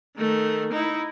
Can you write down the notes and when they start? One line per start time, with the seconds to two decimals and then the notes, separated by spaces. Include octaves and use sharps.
0.17 D#3 A3
0.73 D#4 E4